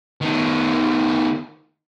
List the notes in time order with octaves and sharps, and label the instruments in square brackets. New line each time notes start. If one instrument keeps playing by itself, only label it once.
[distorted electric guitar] D#3 B3